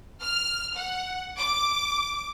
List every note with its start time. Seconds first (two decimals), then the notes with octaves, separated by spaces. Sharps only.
0.22 F6
0.76 F#5
1.37 D6